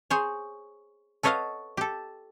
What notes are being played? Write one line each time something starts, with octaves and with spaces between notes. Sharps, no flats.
G#4 C5 C#5
A4 B4 C#5 D#5 F5 F#5
G4 A4